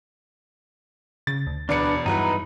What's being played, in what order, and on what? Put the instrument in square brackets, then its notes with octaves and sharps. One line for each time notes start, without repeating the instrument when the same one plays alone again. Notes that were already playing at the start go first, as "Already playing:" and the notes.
[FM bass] C#3 [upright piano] A6
[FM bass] D2
[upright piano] E1 D5 C#7 [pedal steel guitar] D4 B4
[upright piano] E2 F#3 E4 [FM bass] G2 [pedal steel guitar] D#4 B4